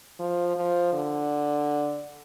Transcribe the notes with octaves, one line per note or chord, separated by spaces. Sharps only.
F3
F3
D3